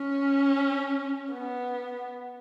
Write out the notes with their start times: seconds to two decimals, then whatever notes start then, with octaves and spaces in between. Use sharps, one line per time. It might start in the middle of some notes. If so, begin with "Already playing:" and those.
Already playing: C#4
1.33 B3